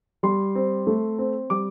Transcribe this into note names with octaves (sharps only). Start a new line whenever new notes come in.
G3 C6
C4
A3
C4
G3 D6